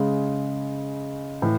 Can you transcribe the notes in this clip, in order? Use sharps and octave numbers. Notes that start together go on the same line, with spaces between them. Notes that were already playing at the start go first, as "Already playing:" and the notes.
Already playing: C#3 G#3
A2 E3